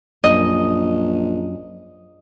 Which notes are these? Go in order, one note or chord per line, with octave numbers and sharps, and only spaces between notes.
A#1 F#2 D#5